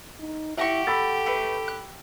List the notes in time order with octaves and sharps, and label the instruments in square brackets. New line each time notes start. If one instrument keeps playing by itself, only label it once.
[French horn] D#4
[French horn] E4 [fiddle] G4 [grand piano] E5 A#6 [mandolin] F#5 A#5 C#6
[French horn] A4 [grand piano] B5 E6 A6
[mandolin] A3 B4
F#6